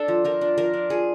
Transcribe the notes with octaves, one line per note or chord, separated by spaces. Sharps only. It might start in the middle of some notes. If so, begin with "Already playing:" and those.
Already playing: D4 A4
F3
F3 A#4
D4
F3 A#4
D4
F3 G#4